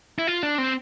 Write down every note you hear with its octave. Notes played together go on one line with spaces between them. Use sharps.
E4
F4
D4
C4